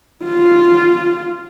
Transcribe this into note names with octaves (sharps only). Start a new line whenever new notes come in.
F4